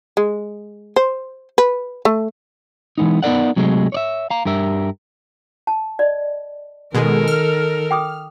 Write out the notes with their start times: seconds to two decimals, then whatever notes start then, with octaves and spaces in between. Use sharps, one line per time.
0.17 G#3
0.96 C5
1.58 B4
2.05 A3
2.98 E3 G#3 B3 D#4
3.23 B3 D#4 A#4 D5 F#5
3.56 C3 F#3 G#3 A3
3.92 C#5 D5 E5
4.30 F5 A#5
4.45 G2 G4 A#4 E5
5.67 A5
5.99 D5 D#5
6.94 B2 D#3 G#3 A4 A#4
7.28 F6
7.91 G5 D6 D#6